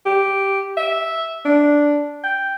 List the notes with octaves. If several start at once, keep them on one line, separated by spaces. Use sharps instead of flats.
G4
E5
D4
G5